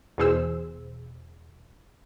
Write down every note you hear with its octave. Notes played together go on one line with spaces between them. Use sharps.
E2 B2 G#4 C5 E6